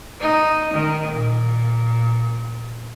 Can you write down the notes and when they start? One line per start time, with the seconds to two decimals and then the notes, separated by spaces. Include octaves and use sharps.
0.20 D#4
0.74 D#3
1.12 A#2